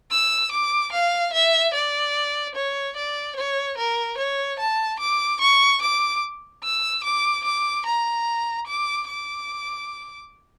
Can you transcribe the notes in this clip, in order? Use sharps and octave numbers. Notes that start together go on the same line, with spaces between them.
E6
D6
F5
E5
D5
C#5
D5
C#5
A#4
C#5
A5
D6
C#6
D6
E6
D6
D6
A#5
D6
D6